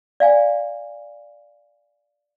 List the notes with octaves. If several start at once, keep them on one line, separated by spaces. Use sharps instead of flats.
D5 F5 G#5